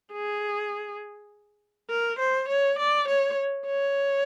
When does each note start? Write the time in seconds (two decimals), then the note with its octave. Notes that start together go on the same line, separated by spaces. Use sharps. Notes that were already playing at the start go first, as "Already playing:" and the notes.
0.13 G#4
1.90 A#4
2.19 C5
2.48 C#5
2.79 D5
3.08 C#5
3.66 C#5